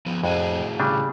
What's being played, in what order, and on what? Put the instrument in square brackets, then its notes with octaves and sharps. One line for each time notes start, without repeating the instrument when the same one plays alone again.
[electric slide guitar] F3 B3
[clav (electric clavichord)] F2 [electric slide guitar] A2 F#4 G#4
[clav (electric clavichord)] C#3 G3 D4